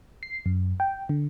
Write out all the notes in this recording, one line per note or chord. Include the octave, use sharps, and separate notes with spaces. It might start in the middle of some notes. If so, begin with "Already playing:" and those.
C7
F#2
G5
D3